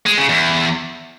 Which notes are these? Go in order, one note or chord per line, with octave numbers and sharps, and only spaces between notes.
G#3
C#3
E2